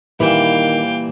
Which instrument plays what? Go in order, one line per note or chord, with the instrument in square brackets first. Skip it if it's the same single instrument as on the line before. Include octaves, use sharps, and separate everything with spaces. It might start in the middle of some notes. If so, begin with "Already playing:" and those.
[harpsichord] A#2 E3 G3 [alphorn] D#3 [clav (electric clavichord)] E4 [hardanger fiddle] F5 G5